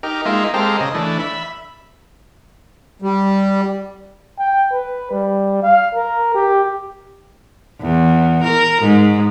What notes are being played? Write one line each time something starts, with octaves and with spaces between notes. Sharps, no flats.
D#4 G4 A#4
G#3 A#3 D#4 F4 E5
G#3 C4 G4 A4 A#4 F5
C#3 D#5
E3 A3 D4
E5 B5
G3
G5
B4
G3
F5
A#4
G4
E2
A#4
G#2